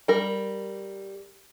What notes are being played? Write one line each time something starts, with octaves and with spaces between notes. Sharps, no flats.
G3 A#4